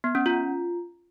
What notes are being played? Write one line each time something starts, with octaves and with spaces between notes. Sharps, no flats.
B3
C#4
F4